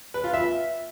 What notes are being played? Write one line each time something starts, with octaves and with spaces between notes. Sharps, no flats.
B4
F4
E5